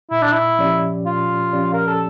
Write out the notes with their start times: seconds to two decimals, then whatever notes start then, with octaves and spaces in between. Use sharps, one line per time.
0.11 A#2 E4
0.22 D4
0.32 E4
0.58 F3 C#4 G4 D5
1.05 A#2 F4
1.53 F3 C#4 G4 D5
1.74 A#4
1.87 A4